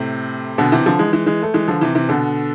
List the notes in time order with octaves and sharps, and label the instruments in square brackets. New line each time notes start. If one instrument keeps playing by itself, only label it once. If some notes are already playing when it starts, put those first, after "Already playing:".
Already playing: [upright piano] A2 C3
B2 D3
C3 E3
D3 F3
E3 G#3
E3 G#3
E3 G#3
A3
E3 G#3
D3 F3
C3 E3
C3 E3
B2 D3